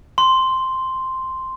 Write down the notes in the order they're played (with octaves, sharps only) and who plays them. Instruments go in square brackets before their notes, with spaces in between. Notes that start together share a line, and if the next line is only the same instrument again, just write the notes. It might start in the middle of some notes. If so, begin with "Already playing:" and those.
[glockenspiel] C6